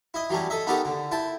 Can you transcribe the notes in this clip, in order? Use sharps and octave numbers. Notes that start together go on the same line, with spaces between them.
E4 D#5
E3 F#3 G3 A3 C#4
A4 D#5 E5
B3 D#4 F#4 G4 A4 A#4
D3
E4 G5 A5